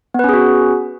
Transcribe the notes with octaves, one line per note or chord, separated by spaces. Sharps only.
B3 C#4 F#4 G#4 B4